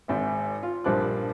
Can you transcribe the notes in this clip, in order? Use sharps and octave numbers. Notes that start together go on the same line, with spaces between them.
G#1 G#2 E5
F4
A#1 G2 F3 D6 F#6